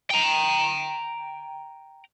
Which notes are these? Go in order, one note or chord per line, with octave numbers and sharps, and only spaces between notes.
G5 A#5